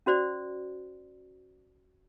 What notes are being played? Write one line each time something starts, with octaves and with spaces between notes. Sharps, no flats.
C#4 F#4 C5 D5